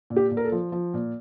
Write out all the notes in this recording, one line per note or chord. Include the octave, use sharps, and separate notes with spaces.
A#2
G4
A#2
A#4
A4
F3
F3
A#2